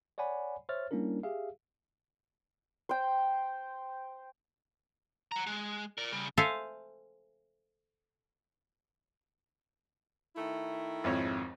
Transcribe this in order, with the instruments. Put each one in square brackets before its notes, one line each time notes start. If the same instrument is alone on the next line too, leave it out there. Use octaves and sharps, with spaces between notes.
[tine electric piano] C#5 D5 F#5 G#5 B5
C5 C#5 E5 F6 A6
G3 A#3 C#4 D4 E4 A#4
G4 G#4 E5 F5
[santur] C5 G5
[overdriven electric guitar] F#5 A#5
G#3
A#4 D5
C#3 G3
[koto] A4 C5 E5 F5 G#5
[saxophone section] D#3 A3 E4
[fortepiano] G#1 F2 C#5